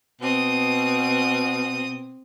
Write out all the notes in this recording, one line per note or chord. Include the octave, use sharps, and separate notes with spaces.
B2 C4 D#6